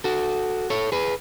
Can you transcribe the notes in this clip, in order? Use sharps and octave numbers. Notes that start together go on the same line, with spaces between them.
F#4 A4
A4 C#5
G#4 B4